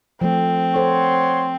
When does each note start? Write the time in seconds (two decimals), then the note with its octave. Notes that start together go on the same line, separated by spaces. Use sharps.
0.21 F3 A3 C4
0.75 A4 C5 C#5 F#5 C6